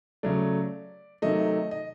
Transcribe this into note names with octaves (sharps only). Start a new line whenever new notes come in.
C#3 F#3 A3 D5
C3 D#3 F#3 A3 D#5
D#5